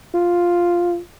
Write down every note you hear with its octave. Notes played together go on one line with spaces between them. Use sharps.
F4